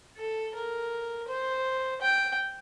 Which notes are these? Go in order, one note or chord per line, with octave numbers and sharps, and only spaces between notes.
A4
A#4
C5
G5